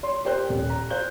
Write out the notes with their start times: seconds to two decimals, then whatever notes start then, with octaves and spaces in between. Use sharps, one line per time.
0.03 C#5 C6
0.25 G4 A#4 C5 G5 F#6
0.49 D#1
0.70 A#5
0.90 C5 F5 F#6 G6